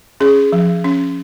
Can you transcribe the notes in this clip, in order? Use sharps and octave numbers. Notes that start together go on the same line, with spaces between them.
C#4 G#4
F3
C#4